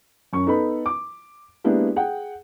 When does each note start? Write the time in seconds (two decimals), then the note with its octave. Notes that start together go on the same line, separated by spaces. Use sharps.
0.33 F#2 C#4 C#6
0.46 B3 D#4 A4 B4 B5
0.86 D6
1.64 G#3 A#3 B3 D4 E4 G4
1.96 G#4 F#5 G5